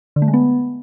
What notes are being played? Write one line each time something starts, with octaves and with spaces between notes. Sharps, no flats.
D3
A3
G#3
B3